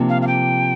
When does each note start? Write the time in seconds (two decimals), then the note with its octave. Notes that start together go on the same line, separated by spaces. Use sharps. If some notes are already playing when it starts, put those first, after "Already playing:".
Already playing: C3 F3 A#3 D4
0.09 F5
0.22 F5
0.27 G5